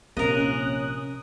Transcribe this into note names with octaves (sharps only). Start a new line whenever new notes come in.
A#1 C3 A#3 C#4 A#4 D#5 D#6 F#6